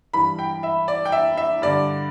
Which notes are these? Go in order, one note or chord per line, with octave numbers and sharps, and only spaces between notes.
G2 E3 B5
G5
E5
D5
G5
E5
E5
G2 D3 D5